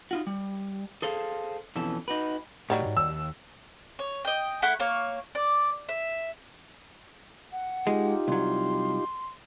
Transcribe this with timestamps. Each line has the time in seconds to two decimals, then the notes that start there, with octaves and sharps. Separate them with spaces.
0.11 D#4 F4 F#4
0.27 G3
1.02 G#4 A4 C5 F5
1.76 F2 B2 E3 C#4 A4
2.08 D#4 F#4 B4
2.70 A2 D#3 F#3 G3
2.82 B1 G#2
2.97 D#2 E6
3.99 C#5
4.25 D#5 G5
4.62 A3 E4 F#5 B5
4.80 A#3 C#5
5.35 D5
5.89 E5
7.52 F#5
7.87 G#3 D#4 F4 G4
8.28 C2 F#3 C6